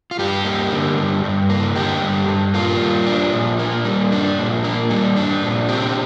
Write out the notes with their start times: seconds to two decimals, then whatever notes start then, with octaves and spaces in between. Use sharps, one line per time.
0.11 F4
0.19 G2 G4
0.45 A#3
0.72 D3
0.97 G2
1.24 G2
1.49 A#3
1.76 D3 G4
2.03 G2
2.28 G2
2.54 A#3 F4
2.81 G3
3.06 D4
3.33 A#2
3.59 A#3
3.85 G3
4.12 D4
4.38 A#2
4.64 A#3
4.90 G3
5.16 D4
5.43 A#2
5.69 C4 G4